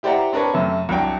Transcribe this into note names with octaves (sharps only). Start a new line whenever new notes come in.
E4 G4 C5 D5 F#5 A#5
C4 D4 A#4 B4 C#5
F#2 C3 A3
C2 F#3 D4 G5